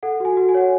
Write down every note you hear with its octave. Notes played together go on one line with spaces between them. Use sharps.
A4 F#5
F#4 G#5
F#4
G#5
C#5 F#5